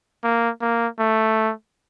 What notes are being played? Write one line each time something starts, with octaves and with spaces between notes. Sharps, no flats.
A#3
A#3
A3